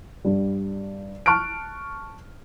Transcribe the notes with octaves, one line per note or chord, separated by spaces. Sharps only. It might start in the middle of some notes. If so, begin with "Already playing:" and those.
G2 G3
A5 C#6 F6 F#6 D7